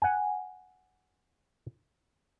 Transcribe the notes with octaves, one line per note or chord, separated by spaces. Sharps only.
F#5 G#5